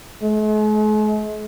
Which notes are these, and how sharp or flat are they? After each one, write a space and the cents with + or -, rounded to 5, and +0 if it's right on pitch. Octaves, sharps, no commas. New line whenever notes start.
G#3 +45